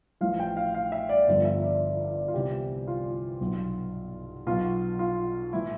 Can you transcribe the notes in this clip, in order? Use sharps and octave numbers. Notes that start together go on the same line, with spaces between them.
A1 A2 F3 F5
G5
F5
F5
E5
D5
G1 G2 D3 F3
E5
D5
F4
C2 C3 E3 G4
F4
B1 B2
B1 B2 F4
F4
A2 E3 E4